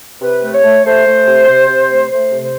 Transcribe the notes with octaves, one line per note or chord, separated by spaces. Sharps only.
C3 B4
A3
C#5
A3
A3 C5
A3
C3
C3
C3
A3
A3 C5
C3
C5